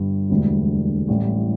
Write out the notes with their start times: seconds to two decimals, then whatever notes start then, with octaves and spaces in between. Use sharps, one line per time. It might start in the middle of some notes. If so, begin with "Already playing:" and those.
Already playing: G1 G2 G3
0.30 E1 D2 D3 G3
1.08 A1 A2 G3